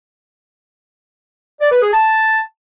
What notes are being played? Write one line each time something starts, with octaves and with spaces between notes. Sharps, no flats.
D5
B4
G#4
A5